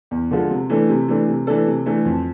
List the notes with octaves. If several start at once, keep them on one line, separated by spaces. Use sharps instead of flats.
E2
D3 F3 G#3
C3
E3 A3 D4 A4
C3
E3 A3 D4 A4
C3
E3 A3 D4 A4
C3
E3 A3 D4 A4
F2